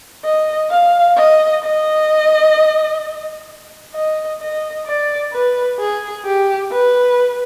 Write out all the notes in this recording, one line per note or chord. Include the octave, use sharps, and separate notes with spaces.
D#5
F5
D#5
D#5
D#5
D#5
D5
B4
G#4
G4
B4